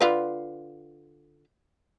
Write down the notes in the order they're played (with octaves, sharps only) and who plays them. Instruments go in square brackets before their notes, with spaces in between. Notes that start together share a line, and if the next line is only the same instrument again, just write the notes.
[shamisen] D3 F4 B4